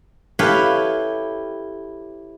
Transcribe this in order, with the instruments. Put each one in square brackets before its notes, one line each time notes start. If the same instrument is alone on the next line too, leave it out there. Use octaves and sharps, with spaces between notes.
[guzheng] E4 G4 A4 B4 C#5 F5